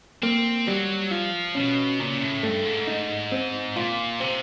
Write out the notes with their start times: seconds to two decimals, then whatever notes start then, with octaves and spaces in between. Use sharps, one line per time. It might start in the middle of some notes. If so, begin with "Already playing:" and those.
0.22 A#3 C4
0.67 F#3 G3
1.11 F3 F4
1.55 B2 C#4
2.00 A#2 C#3
2.21 A2
2.43 G2 A3
2.65 G#2
2.87 D#4
3.32 C4
3.76 A#2 F4
4.20 C3 C4